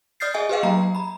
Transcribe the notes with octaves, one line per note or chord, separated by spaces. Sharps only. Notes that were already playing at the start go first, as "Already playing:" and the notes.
D5 D#6 F6 G6 A6 C7
G#4 D#5 E5 G#5 D#6
G4 G#4 B4 D#5 F5 G5
F#3 A#3 A#5
A#5 B5